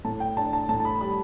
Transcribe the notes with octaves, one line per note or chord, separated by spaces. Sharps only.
A2 A5
G5
D4 A5
A5
A2 A5
A5
B5
G3 B5